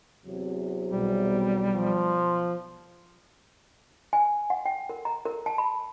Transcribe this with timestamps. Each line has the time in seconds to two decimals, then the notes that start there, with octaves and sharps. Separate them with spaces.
0.25 E2 C3 F#3
0.91 B1 G3
1.74 F3
4.13 G#5
4.50 F#5
4.65 G5
4.89 A#4
5.05 A#5
5.26 A#4
5.46 A5
5.58 B5